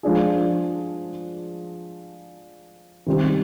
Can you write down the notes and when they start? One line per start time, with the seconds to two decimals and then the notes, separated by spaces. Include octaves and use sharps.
0.03 F3 G#3 D4 G#4
3.06 C3 D#3 G3 C4